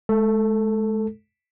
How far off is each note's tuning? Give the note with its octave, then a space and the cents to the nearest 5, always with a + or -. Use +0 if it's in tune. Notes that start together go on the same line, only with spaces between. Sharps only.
G#3 +35 A4 +10